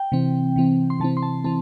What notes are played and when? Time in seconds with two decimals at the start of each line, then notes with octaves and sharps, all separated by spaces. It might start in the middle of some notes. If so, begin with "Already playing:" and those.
Already playing: G5
0.12 C3 E3 C4
0.56 C3 E3 C4
0.90 C6
1.00 C3 E3 C4 A5
1.17 C6
1.23 A5
1.44 E3 C4 A5